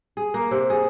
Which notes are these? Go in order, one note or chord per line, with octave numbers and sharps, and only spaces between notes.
G#4
A#3
C3
G#4